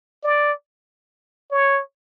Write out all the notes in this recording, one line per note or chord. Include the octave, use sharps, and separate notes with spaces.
D5
C#5